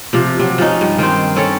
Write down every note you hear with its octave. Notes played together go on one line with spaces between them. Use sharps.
C3 F3
C3 F#3
F3 C#4 D#4
G2
D#3 C4 D#4 C5
C4 C#4 A4 C#5